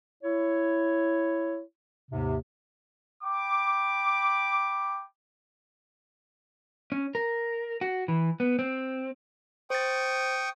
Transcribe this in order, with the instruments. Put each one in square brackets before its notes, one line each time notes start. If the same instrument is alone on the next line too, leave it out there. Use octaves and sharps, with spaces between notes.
[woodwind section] E4 C#5
D#2 G#2 C3
[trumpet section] G5 B5 D6
[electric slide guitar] C#4
A#4
F#4
E3
B3
C4
[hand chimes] C5 A6 [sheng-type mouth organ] G5 C#6 D#6